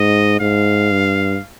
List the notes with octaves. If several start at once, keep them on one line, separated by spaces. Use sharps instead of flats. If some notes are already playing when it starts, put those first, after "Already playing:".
Already playing: G#2 D#5
G#2 F5
G2